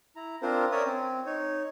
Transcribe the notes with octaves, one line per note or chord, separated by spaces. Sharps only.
E4 A#5
C4 D4 F4 A#4 C5
C#4 A#4 C#5 D5 E5 D#6
C4
D#4 C#5